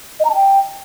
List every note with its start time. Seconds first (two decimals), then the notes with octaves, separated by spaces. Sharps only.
0.20 D#5
0.25 A#5
0.30 A5
0.35 G5